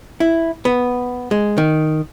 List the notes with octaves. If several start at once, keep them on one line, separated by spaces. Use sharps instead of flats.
E4
B3
G#3
D#3